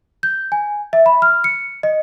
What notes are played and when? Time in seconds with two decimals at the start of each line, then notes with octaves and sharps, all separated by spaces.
0.23 G6
0.52 G#5
0.93 E5
1.06 B5
1.22 F6
1.44 C#7
1.83 D#5